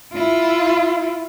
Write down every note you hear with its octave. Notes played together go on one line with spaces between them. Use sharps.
E4 F4